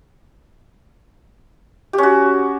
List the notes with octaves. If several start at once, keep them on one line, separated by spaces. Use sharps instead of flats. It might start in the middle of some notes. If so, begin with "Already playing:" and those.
C#4 F#4 G4